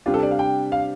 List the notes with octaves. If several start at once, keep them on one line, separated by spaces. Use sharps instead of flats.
C3 G3 D4 F4 G4
A4
D5
F5
G5
F5